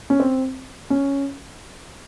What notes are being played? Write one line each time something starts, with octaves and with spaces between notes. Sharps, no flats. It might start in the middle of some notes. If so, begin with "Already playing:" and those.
C#4
C4
C#4